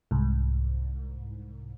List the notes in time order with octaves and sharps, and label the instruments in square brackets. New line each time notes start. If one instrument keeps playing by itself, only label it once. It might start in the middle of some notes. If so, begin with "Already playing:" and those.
[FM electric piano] C2 G#2